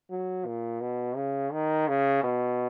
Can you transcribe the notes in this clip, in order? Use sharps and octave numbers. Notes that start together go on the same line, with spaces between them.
F#3
A#2
B2
C#3
D#3
C#3
B2